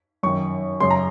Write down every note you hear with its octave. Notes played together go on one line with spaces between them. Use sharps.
F#2 D#3 C#6
F#2 C#3 C6
A#5